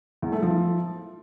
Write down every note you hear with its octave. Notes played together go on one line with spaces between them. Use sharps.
E2
A3
F3